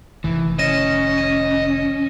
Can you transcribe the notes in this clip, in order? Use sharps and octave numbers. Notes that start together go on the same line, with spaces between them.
F1 D#3 E3
C#4 D#5 A#6 D#7 E7
D#7